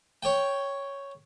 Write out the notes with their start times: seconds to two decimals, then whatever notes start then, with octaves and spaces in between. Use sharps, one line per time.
0.23 C#5 G5